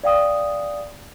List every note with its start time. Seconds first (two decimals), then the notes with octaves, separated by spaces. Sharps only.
0.04 D5 F5 G5 D#6